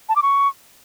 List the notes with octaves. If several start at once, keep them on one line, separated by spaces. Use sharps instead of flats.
A5
D6
C#6